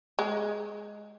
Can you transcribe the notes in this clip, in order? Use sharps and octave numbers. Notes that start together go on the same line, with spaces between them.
G#3